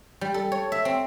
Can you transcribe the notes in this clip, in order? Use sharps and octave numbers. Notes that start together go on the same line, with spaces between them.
G3
A4
C#5
E5
C4